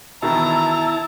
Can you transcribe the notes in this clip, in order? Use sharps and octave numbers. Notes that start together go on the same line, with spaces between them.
B2 D#3 E3 E4 A5 A#5